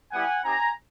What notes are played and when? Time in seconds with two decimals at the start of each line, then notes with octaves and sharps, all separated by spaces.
0.12 G3 B3 E4 G4 F#5 G#5
0.43 C4 D#4 G4 G#5 A#5